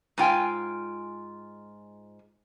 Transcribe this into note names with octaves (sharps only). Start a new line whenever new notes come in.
G#2 F4 G5 G#5